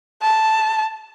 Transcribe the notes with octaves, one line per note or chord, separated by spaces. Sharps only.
A5